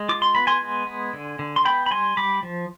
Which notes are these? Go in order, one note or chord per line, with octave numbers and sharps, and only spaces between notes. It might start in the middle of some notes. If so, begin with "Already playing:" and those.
Already playing: G#3
F4 D6
C6
B3 B5
G#5 C6
G#3
B3
D3
D3
C6
B3 G5 B5
B5
G3 G#5 C6
G3 B5 D6
F3